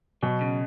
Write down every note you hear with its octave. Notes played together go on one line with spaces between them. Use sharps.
B2 F#3
C#3